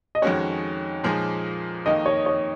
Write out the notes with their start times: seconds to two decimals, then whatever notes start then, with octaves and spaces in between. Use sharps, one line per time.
0.15 D#5
0.22 F2 D#3 G#3 C#4 F#4 C#5
1.04 A#2 F3 G#3 D#4 G#4
1.86 F2 D#3 A#3 D#5
2.06 C#5
2.26 C#5